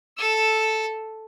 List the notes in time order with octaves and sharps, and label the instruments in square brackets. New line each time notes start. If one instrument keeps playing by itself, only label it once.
[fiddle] A4 E6